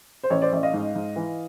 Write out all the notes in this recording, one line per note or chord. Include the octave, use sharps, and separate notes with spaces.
C5
A1 C#5
C5 D5
A1 D5 E5
D#5 F5
G#2
G#2
E3